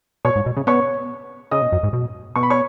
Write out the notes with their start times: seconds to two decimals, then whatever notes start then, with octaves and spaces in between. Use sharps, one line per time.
0.25 B2 C#5 C#6
0.36 G#2
0.46 B2
0.57 C#3
0.67 B3 C#5 C#6
1.51 C#3 D#5 D#6
1.62 B2
1.72 F#2
1.83 G#2
1.93 B2
2.36 B2 C#6
2.43 B5
2.50 C#5 C#6